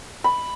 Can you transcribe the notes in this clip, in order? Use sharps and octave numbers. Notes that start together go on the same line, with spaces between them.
B5